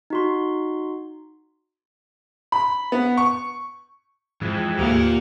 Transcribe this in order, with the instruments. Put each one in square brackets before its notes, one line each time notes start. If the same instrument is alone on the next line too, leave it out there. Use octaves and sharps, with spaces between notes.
[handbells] D#4 F#4 C6
[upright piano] B5
B3
C#6
[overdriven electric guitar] F2 [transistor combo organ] G#2 E3
[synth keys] D2 G4 D7 [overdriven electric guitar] A#2 F5 [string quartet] A#3 F#5